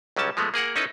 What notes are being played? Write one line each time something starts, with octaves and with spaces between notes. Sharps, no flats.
C#2 F#3 G3 C#4 A5
F3 G#3 A3 B3
A#3 G#4 A#4 F#5
C#4 D#4 E4 A4 B4